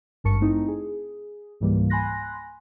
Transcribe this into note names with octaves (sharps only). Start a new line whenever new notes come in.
G#1 G2 A#4 A5 C#6 C#7
A3 C4 D#4 E4
G#4
C#2 G#2 E3 G3 A#3
G#5 B5 C6 F#6 A#6